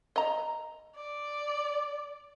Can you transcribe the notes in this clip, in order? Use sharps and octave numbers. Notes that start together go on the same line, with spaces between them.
D#5 A#5
D5